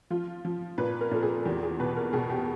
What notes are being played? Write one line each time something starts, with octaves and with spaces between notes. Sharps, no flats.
F3 F4
F3
A#2 B4
A#4
A#2 A4
G#4
E2 G4
G#4
B2 B4
A#4
B2 G#4
G4